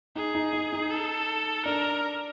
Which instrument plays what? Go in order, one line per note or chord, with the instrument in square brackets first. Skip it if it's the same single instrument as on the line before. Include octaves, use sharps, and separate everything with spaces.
[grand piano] D#4 [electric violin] G#4
[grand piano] D#4
D#4
D#4
[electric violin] A4
[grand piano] D4 [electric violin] A#4